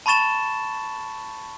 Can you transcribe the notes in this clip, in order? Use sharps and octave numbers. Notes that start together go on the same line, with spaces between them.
A5 B5 C#6 A6 E7 G7